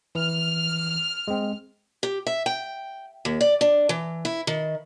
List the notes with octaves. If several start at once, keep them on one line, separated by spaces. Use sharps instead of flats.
E3 F6
G#3 C4
G4
E5
G5
D#2
D5
D4
E3
E4
D#3